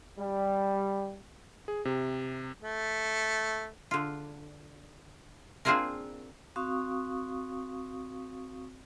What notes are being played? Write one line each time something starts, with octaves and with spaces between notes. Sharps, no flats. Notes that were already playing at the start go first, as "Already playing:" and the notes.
G3
G#4
C3
A3
D3 F4
A#3 C4 D4 F4 G#4 A#4
C4 F#4 F5 C#6 D#6